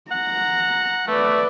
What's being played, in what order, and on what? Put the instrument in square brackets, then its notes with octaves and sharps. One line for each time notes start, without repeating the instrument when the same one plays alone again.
[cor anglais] F#5 [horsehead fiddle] A#5
[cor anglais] A3 [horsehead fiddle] B4 D5